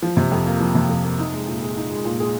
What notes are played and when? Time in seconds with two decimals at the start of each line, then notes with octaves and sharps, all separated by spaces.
0.02 F3
0.17 C3
0.32 F2
0.46 A#3
0.60 F3
0.75 C3
0.89 F2
1.04 A#3
1.19 D#4
1.33 G#3
1.47 A#2
1.62 G#4
1.77 D#4
1.91 G#3
2.05 A#2
2.20 G#4